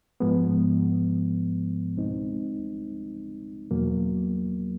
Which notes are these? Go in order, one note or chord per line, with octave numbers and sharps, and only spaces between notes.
G#2 F3 G#3 B3
C#2 B2 G#3 C4 D#4
E2 B2 F#3 A#3